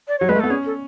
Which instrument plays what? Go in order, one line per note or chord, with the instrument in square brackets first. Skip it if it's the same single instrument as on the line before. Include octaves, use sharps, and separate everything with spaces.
[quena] D5
[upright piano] F#3 [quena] C#5
[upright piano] G#3 [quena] B4
[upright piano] A3
[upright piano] B3 [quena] A4
[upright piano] C#4 [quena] G#4
[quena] A4